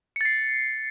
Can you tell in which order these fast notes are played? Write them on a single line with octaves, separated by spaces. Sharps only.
C#7 A6 C7